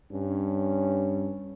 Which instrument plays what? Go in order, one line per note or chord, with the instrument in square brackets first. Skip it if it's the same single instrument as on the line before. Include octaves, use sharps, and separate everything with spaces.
[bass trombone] G2 [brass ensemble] C#4